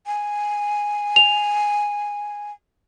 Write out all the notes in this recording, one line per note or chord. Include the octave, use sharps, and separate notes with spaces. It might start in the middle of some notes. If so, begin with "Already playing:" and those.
G#5
F7